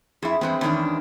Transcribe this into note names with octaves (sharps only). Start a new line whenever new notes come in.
F2 E4 G#4
E2 G2 G#3 C4 B4
E2 D#3 G#3 C#4 D4